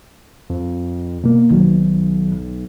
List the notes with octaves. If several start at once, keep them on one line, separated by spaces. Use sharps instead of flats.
F2
B2 A#3
B1 D#3 F#3